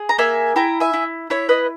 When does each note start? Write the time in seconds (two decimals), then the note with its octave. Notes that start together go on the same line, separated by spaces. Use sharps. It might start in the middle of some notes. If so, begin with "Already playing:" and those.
Already playing: G#4
0.09 A#5
0.18 A#3 E5 G#5
0.56 E4 G5 A#5
0.80 E5 G#5
0.93 E4
1.30 E4 C#5 E5
1.49 B4 D#5